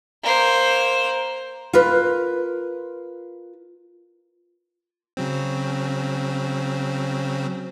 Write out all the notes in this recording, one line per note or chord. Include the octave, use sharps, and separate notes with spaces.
A#3 C5
F4 A#4 B4
C#3 F#3 C4